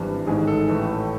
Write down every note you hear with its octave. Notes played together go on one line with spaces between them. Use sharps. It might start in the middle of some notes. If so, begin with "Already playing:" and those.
Already playing: G#1 G2 E3
A1 G#2 D#3 G#3 G#4
A4
A1 A2 E3